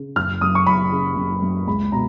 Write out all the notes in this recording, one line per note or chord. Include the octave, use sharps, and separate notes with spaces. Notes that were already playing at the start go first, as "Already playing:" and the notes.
Already playing: C#3
F#1 F6
F#2 D#6
C#6
F#1 B5
C#3
F#1
F#2
C#2 B5
B2 A#5